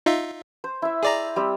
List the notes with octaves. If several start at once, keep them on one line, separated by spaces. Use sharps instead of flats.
D#4 F4 E5
C5
E4 E5
G#4 D5 A#5
G3 C4